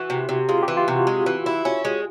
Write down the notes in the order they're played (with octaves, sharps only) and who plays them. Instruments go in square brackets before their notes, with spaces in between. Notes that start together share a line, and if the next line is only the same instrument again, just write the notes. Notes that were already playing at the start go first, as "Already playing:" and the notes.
Already playing: [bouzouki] E3 [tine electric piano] F#4
[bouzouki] C3
C3
[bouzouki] G#3 [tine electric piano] F4
[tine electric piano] G4
[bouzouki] E3
[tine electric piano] F4
[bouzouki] C3 [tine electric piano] F#4
[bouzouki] G#3
E3
E4
C#4
G#3